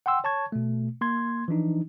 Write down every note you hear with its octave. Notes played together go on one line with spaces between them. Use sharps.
F#5 G5 C6 E6
C#5 A5 C#6 G#6
B2 A3
A#3 C6 G#6
E3 F3 D4 D#4